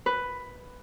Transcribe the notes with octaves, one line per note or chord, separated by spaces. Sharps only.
B4